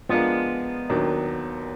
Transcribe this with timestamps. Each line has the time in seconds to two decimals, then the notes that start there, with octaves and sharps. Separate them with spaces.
0.09 F3 G#3 B3 D4 F4 A#4
0.89 D#2 D#3 F#3 D4